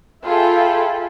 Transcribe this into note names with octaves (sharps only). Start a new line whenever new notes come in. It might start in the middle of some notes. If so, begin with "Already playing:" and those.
F4 G#4 A4 E5 G5 B5